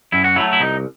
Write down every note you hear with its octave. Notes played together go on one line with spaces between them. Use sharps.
F#2 E4
F#4
F#3 A3 E4
E4
C2 D#4